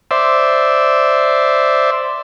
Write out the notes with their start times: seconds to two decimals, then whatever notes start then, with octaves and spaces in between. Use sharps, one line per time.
0.11 C5 D5 E5